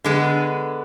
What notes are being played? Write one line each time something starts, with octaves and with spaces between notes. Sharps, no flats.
D3 G#3 B3